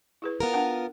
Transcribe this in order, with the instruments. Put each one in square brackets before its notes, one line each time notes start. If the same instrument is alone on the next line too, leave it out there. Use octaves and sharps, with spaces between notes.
[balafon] E4 G#4 B4
[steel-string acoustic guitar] B3 F4 A#4
[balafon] D4 F#5 G5